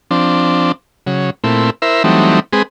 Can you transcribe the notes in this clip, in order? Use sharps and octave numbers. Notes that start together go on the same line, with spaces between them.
F3 C4 D4
C#3 F#3
A#2 A3 C4 E4
E4 A#4 C5 E5
E3 F#3 G3 A3 C4 D#4
G#3 C4 G#4 B4